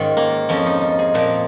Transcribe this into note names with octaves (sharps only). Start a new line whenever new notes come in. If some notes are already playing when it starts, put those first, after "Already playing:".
Already playing: G#2 D#3 C#4 D#4 F4
A#3
F2 F3 C#4
D#4
F4
G#4
A#2 F3 A#4